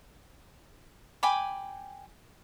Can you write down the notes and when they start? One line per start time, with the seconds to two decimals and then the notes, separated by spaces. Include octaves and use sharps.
1.23 G5 G#5 B5 D6